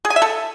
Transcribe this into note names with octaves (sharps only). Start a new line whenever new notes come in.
G#4
G#5
E5
A4